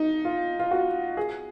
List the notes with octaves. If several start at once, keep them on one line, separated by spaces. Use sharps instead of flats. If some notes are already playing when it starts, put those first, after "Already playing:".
Already playing: D#4
F4
F4
F#4
G#4